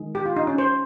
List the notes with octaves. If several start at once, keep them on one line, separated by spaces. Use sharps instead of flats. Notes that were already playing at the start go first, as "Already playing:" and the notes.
Already playing: D#3 G#3
G4
F4
D#4
C#4
C5